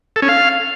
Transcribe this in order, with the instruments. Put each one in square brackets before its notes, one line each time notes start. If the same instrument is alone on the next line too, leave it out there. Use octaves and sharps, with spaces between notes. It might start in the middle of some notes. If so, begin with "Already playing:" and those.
[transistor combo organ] A4
C#4
F5